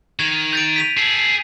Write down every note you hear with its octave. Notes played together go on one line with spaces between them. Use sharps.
D#3 G#6 F7
G6 A6 D7
B6 D#7 F7
G#4 A4